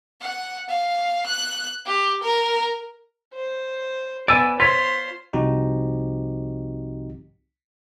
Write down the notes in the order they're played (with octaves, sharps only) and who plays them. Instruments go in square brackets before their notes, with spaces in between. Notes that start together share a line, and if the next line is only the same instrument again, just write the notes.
[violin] F#5
F5
F#6
G4
A#4
[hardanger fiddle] C5
[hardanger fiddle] B3 [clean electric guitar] D5 G#5 [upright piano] E6
[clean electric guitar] F4 C#5 [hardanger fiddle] C5 C6 [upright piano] B6
[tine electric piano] C2 F3 C4 D#4 F#4 G4